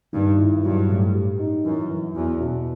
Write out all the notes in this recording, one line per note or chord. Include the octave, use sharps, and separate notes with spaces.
G2 D#3
E4
G2 F#3
A2
G4
D#4
F#2 E3
E3
E2 F#4
B2